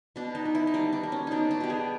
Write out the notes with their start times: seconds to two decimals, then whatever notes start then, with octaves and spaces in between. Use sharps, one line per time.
0.16 B2 D4
0.35 D#4
0.45 B2
0.55 E4
0.67 D#4
0.74 G3 D4
0.93 D4
1.03 A#3
1.12 C#4
1.27 B2 D4 D#4
1.51 D4
1.61 B2 G4
1.70 G#4